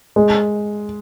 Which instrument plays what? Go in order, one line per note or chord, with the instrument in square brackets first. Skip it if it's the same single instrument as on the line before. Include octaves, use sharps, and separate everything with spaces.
[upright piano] G#3